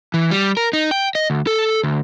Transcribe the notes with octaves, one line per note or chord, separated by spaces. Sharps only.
E3
G3
A#4
D#4
G5
D#5
D2
A4
D2